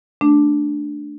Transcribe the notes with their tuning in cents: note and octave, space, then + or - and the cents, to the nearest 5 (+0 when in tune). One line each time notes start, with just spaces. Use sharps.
A3 -5 D4 +0